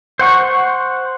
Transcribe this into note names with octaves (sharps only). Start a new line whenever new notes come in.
C5 F#5 C#6